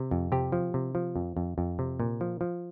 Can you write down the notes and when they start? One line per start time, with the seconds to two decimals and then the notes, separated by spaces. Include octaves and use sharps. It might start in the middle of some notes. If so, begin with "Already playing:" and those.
Already playing: C3
0.11 F2
0.32 C3 G4
0.52 F3
0.74 C3
0.95 F3
1.16 F2
1.37 F2
1.58 F2
1.79 C3
2.00 A#2
2.21 F3
2.41 F3